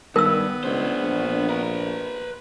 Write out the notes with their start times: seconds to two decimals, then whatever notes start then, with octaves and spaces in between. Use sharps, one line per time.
0.16 G2 D#3 B3 A#4 E6
0.64 C#2 D4 C5
1.04 A#1
1.49 B4 A#5